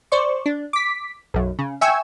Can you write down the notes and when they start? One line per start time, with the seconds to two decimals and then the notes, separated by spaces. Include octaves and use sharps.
0.12 C5 D5 C#6
0.46 D4
0.73 D6 B6
1.34 B1 F#2
1.59 C#3
1.81 E5 G5 G#5 C#6 E6